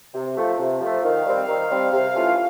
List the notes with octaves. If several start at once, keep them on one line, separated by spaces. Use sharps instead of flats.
C3
F3 A3
C3
F3 A3
D#3 F5
G3 C4
D#3
G3 C4
C3
E3 A3 C#4 F4